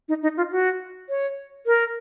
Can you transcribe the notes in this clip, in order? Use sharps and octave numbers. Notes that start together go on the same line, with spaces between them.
D#4
D#4
F4
F#4
C#5
A#4